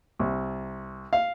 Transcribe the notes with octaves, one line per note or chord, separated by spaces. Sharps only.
C2
F5